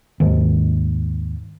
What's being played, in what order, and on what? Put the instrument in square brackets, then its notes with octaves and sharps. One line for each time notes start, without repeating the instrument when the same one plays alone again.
[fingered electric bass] D#2 G#2